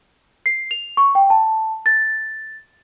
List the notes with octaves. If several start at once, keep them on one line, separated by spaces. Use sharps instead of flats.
C7
F7
C#6
G5
A5
A6